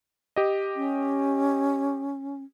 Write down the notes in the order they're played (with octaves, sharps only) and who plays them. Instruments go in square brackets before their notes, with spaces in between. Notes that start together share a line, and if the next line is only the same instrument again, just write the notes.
[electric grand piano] G4 D#5
[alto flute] C#4